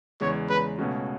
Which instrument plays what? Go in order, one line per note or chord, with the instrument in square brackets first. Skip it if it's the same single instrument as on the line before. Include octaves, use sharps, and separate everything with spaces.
[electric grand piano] E2 C#3 G#3 [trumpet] C#5
[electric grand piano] E2 C#3 G#3 [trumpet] B4
[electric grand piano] C#2 B2 A3 C#4 F#4